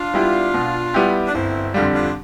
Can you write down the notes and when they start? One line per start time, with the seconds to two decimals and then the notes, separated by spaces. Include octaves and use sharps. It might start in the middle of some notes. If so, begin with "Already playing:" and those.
Already playing: D4 F4
0.14 G3 B3 E4 G4
0.54 B2
0.94 G3 B3 E4 G4
1.27 D4
1.34 G1 C4 E4
1.74 F2 D3 G3 F4
1.94 D4 F4